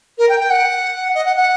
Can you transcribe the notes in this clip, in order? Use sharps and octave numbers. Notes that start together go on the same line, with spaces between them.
A#4
G5
G5
F#5
D#5
F#5
F#5